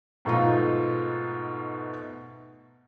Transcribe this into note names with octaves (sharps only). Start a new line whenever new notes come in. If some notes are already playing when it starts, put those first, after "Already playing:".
G#2 B2 A3 D#4 F4